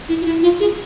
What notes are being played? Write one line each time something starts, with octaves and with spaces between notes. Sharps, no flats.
E4
F4
E4
F4
G#4